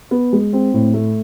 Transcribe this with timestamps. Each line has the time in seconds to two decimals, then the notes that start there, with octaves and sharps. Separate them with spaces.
0.11 B3
0.33 G#3
0.53 C4
0.74 A2
0.94 A3